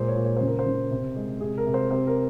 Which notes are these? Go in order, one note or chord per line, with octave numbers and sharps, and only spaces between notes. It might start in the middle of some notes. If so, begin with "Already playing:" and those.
Already playing: A#2 G#3 C5
C#5
A#2
C#5
C#3 C5
A#4
C5
C#3
C3
G#3
C3 G#4
A#4
C3
C5
C3 C5
A#4